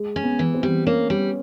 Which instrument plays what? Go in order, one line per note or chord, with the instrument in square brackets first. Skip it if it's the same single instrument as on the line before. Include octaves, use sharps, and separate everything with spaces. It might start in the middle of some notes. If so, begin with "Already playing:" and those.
Already playing: [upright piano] G#3
[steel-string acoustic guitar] C#4
[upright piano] B3
[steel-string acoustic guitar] E3
[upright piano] C4
[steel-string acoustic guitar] G3
[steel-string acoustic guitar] A#3 [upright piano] C#4
[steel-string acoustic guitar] G3